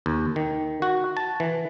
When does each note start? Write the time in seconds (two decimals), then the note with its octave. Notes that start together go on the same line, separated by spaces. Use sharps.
0.06 D#2
0.36 D#3
0.82 F#4
1.17 A5
1.40 E3